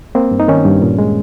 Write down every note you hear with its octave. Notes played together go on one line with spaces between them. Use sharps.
A#3 C4
G2
D#4
D#3 C#4
G2
A#2
G#3